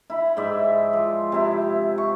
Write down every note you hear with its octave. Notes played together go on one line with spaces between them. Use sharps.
E4 B5
G#2 D5 E5
F3
C3 E4
C#6